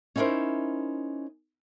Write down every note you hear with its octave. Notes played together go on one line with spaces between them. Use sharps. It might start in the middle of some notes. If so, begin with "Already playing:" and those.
C#4 D#4 E4 G#4 A#4 C5